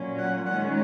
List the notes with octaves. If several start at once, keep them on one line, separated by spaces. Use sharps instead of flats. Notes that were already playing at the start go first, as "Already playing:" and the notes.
Already playing: A#2 F#3 A#3 C#4
F#5
D#3 G#3 C#4 F#5